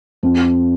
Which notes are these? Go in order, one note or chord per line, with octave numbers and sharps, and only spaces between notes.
F2